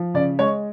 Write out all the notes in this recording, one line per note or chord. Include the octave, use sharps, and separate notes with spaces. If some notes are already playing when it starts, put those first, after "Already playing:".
Already playing: F3
C#3 D5
G#3 C#5